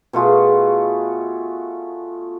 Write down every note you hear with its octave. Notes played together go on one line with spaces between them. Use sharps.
B2 A3 F4 G#4